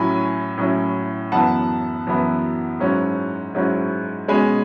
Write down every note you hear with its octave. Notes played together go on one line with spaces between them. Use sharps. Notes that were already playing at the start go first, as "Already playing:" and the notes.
Already playing: A2 F#3 C#4 E4 G#5 B5
A2 F#3 C#4 E4
F#2 E3 B3 E4 F#5 A5
F#2 E3 B3 E4
G#2 F#3 C#4 E4
G#2 F#3 C#4 E4
B2 G#3 C#4 G#5 B5